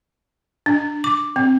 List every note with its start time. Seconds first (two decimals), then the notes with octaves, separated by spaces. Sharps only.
0.66 D4
1.04 D6
1.36 C4